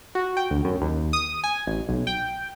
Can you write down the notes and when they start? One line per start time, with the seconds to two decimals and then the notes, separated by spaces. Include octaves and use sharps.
0.15 F#4
0.37 G5
0.50 D2
0.65 F#2
0.81 D#2
1.13 D#6
1.44 G#5
1.67 A1
1.89 B1
2.07 G5